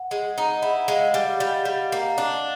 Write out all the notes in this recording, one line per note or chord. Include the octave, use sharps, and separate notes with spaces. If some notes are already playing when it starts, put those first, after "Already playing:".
Already playing: F#5
G#3
D#4
E4 F#5
G#3 F5
G3 D#5
G3
G3
A#3
D4